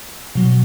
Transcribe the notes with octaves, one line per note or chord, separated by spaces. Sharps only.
B2 F#3